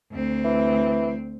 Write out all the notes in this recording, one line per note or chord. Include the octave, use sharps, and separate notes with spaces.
D2 C4
E3